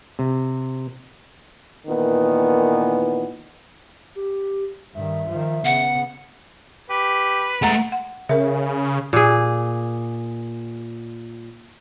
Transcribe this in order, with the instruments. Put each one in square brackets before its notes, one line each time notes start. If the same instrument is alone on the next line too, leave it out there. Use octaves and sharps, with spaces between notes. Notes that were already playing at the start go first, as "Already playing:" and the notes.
[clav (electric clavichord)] C3
[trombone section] A#2 D#3 E3 B3
[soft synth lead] G4
[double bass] G2 D#3 [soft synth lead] E5
[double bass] D#3 F3
[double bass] C#3 B3 [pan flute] F#5
[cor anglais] G4 [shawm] B4
[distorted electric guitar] G#3 A3 [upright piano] F#5 A#5 A6
[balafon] F#5
[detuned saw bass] C#3 [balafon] A#4 E5
[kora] A#2 G#4